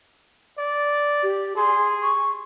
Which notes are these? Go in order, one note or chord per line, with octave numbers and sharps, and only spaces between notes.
D5
G4
G#4 C6
C#6